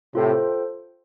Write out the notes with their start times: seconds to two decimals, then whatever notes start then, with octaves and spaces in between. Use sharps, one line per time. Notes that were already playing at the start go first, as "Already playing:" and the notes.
0.14 A2 C3 F4 A4 C5 G5